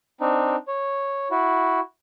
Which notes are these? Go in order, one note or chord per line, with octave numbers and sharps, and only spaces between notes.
C4 D4 D#4
C#5
E4 F#4